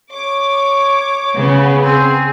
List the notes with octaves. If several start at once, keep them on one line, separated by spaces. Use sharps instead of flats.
C#5 D6
C#3 B3
C4 G#4